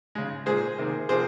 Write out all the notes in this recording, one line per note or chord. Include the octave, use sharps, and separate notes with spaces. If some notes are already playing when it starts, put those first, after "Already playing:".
C#3 G#3
A#2 G#3 G#4 C5
C3 D#3 A#3
C3 F3 A#3 G#4 C5